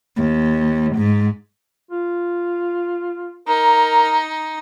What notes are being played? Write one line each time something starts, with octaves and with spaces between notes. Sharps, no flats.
D#2
G#2
F4
D#4 A#4 A#5